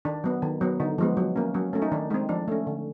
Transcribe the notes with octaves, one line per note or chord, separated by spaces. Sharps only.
D#3 D4
F#3 B3
D#3
F#3 B3
D3 D#4
F3 G#3 B3
F#3
A#3 C#4
F#3 C#4
A3 C#4
D#4
D#3 D4
G#3 C4 D#4
F3 D4
A3 C#4
D3